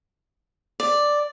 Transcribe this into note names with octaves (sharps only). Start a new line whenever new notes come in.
D5